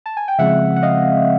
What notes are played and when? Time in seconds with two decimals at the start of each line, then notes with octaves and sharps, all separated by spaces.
0.06 A5
0.17 G#5
0.28 G5
0.38 C#3 F3 G#3 C4 E5 F#5
0.77 F#5
0.83 D#5 F5